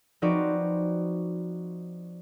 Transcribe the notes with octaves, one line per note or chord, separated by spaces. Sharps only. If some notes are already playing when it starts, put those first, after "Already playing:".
F3 C4 D#4 F#4 B4 D5